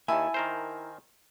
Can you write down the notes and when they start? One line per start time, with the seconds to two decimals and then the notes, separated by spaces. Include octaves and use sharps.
0.08 D#2 D#3 E4 G#5 A5
0.34 D#3 A#4 C5